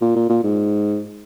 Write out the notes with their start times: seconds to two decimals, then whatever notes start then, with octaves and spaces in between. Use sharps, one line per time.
0.01 A#2
0.16 A#2
0.29 A#2
0.44 G#2